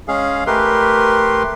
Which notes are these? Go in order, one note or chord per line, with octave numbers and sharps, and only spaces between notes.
G#3 C#4 G#4 F5
A3 G4 A#4 B4 C6